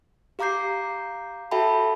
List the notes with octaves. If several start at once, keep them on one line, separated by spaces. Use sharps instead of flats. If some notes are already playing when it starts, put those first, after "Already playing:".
G4 F5 A#5 D6 G6 C7
F#4 A4 E5 G5 A5 B5